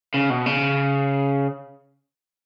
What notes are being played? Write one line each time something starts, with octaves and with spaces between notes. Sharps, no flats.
C#3
B2
C#3